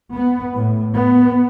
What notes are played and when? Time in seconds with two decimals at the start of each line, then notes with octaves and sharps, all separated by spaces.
0.14 B3
0.55 A2
0.95 B3